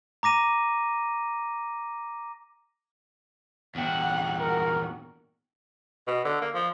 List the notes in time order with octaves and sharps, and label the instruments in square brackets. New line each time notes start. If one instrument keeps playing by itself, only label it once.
[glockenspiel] A#5 D6 A#6 D#7
[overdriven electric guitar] E2 A#2 [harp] D3 B3 G5 [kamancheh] F#5 F#6
[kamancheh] F#4 F#5 [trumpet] A#4
[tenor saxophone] B2
D3
A#3
F3